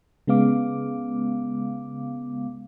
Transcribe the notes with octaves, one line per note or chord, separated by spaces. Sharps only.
C#3 G#3 B3 F5 D6